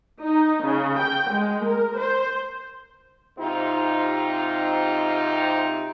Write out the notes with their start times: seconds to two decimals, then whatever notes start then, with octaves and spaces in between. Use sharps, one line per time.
0.22 D#4
0.64 C#3
0.99 G5
1.31 G#3
1.64 A#4
1.98 C5
3.39 G#2 C3 C4 D#4 F4 G4